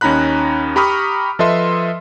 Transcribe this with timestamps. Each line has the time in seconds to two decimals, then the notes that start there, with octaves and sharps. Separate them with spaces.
0.01 D#2 C#4 D#4 A#5 B5 F#6
0.76 G4 A#5 B5 C#6 D#6 F6
1.39 F3 A4 B4 D#5 E5 C6